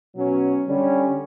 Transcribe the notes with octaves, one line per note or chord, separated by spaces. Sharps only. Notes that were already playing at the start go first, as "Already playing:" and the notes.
B2 F#3 C#4
D3 G3 C#4